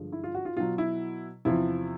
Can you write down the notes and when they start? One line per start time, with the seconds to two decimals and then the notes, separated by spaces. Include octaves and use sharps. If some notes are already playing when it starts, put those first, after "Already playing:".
Already playing: G2 D3 F3 G#3
0.12 E4
0.24 F4
0.34 F#4
0.45 F4
0.57 B2 F#3 F4
0.78 E4
1.45 E2 C3 F3 E4